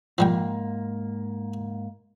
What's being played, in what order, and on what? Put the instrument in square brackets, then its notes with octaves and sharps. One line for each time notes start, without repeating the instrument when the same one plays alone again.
[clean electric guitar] G#2 A#3 [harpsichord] F3 G3 G5